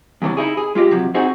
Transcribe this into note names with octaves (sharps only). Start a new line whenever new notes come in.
E2 G2 C#3 E3 D4
D#4 E4 G#4
G#4
G#3 F4 G4 D#5
C3 F3 F#3
C4 D#4 F#4 G#4